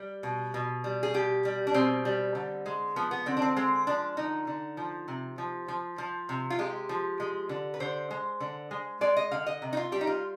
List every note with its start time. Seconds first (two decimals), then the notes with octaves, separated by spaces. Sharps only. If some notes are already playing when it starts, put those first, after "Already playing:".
Already playing: G3
0.23 B2
0.54 B2
0.84 G3
1.03 G#4
1.14 B2 G4
1.45 G3
1.67 D4
1.74 B2 C4
2.05 G3
2.35 D3
2.66 G#3
2.96 F3 B3
3.11 B3
3.26 D3 C4
3.37 D4
3.42 C4
3.57 G#3 C4
3.87 F3 D4
4.17 D3 D#4
4.47 D3
4.77 F3
5.08 C3
5.38 F3
5.68 F3
5.98 F3
6.29 C3
6.50 F4
6.59 G#3 G4
6.89 F3
7.20 G#3
7.49 D3
7.74 B4
7.80 D3 C5
8.11 G#3
8.40 D3
8.71 G#3
9.01 G#3 D5
9.17 D#5
9.31 D3 F5
9.46 D#5
9.62 C3
9.73 D#4
9.77 F4
9.92 G3 G4
10.01 D#4
10.07 F4